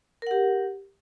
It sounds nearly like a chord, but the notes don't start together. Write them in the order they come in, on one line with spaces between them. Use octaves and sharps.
A#4 F#5 G4